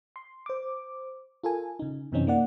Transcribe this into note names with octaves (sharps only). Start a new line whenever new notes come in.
C6
C5 D6
F4 A4 A#4 G#5
C#3 D#4
F#2 C3 E3 C4 C#4 D#4
A#3 D#4 D5 F#5